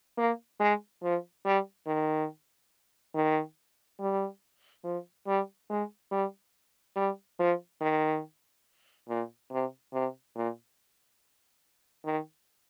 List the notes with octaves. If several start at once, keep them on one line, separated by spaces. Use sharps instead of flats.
A#3
G#3
F3
G3
D#3
D#3
G3
F3
G3
G#3
G3
G3
F3
D#3
A#2
C3
C3
A#2
D#3